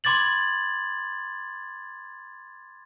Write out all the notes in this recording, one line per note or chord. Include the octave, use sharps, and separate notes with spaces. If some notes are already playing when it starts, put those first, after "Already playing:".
B5 C6 D6 G#6 A6 F#7